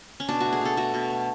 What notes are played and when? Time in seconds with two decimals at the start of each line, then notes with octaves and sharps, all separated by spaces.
0.20 C#4
0.29 B2 D4
0.40 A3 F#4
0.53 G#4
0.61 B2 A4
0.77 A3 F#4
0.94 B2
1.10 A3